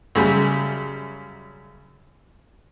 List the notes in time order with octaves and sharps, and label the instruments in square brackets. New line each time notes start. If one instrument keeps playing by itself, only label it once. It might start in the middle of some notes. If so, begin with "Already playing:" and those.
[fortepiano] F#2 C#3 G3